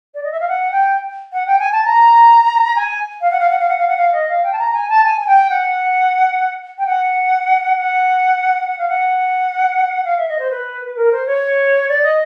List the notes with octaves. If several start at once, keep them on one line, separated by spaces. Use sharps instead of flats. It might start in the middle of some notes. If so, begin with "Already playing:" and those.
D5
D#5
E5
F5
F#5
G5
F#5
G5
G#5
A5
A#5
G#5
F5
F#5
F5
F#5
F5
F#5
F5
F#5
F5
D#5
F5
G5
A5
A#5
G#5
A5
G#5
G#5
G5
F#5
G5
F#5
F#5
F#5
F5
F#5
F5
E5
D#5
C5
B4
B4
A#4
C5
C#5
D5
D#5